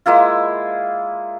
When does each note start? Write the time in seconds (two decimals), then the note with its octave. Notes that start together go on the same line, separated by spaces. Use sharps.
0.06 G#3 A#3 E4 F4